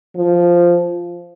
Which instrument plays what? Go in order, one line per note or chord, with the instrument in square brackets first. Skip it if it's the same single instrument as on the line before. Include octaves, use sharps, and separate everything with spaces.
[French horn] F3